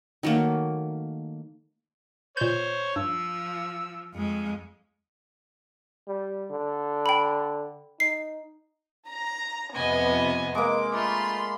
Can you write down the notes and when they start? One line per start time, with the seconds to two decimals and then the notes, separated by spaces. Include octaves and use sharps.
0.23 D#3 F#3 A3 A#3
2.37 A#2 C5 C#5 G6
2.96 G2 F3 E6
4.15 F2 G#3
6.08 G3
6.50 D3
7.06 G5 B5
8.00 D#4 C7
9.08 A#5
9.75 F2 C3 B3 D#5 G#5
10.55 G#3 A#3 D6
10.94 A3 F4 B5 C6